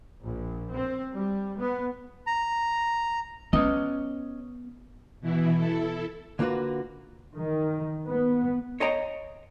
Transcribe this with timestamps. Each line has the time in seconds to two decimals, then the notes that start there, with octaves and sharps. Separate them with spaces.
0.24 A#1
0.74 C4
1.14 G3
1.59 B3
2.27 A#5
3.53 B3 C#4 D#5
5.21 B2 E3 E4
5.56 E4 A4
6.39 D3 A#3 F4 F#4 B4
7.34 D#3
8.08 B3
8.80 C#5 D#5 G5 A#5